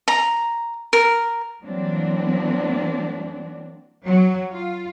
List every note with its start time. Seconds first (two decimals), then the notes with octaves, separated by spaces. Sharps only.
0.08 A#5
0.93 A#4
1.63 E3 F#3 G3 A#3 C4 D4
4.05 F#3
4.52 F4